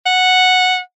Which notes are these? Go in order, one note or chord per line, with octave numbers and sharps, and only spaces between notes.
F#5